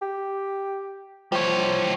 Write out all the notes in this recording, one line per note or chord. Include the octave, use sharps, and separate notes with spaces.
G4
F3 G3 C#5